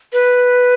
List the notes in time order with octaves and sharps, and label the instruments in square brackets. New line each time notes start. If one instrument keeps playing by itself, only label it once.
[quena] B4